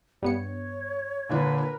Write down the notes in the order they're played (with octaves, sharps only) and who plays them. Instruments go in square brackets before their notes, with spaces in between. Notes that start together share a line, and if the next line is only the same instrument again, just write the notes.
[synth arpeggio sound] G2 B3 C#7 [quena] C#5
[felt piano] A#2 D3 D4 [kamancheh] A#4 B4